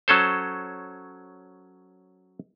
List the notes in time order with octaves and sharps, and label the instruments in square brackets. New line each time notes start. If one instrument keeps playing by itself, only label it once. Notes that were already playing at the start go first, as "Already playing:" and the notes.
[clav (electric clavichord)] F#3 C#4 A4 C5